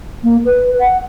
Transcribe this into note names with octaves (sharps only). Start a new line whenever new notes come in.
A#3
B4
F#5